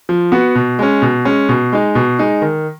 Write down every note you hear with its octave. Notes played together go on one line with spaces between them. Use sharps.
F3
B3 F#4
B2
G#3 C#4
B2
G#3 C#4
B2
G#3 D#4
B2
G#3 D#4
D#3